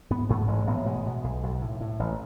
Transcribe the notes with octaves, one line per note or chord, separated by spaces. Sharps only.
G#2 B3
G#2 A3
A1 G#3
A1 B3
B2 G#3
B2
B1
B1
A2
A2
A1